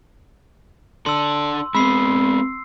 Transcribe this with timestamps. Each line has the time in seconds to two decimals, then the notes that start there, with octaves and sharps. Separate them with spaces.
1.06 D4 A4 C6 E6
1.75 G#3 B3 C4 B5 E6 C7